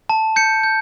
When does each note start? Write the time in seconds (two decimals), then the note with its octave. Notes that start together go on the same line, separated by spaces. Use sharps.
0.09 A5
0.36 G6 C#7
0.64 G6